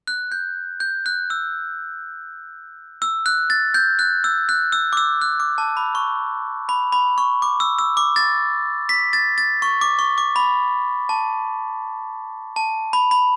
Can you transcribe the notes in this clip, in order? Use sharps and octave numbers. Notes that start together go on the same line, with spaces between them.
F#6
G6
G6
F#6
E6
E6
F#6
A6
G6
F#6
E6
F#6
E6
D6
E6
F#6
D6
A5
B5
C#6
B5
B5
C#6
D6
E6
E6
D6
A6
B6
A6
A6
C#6
D6
C#6
D6
B5
A5
A5
B5
B5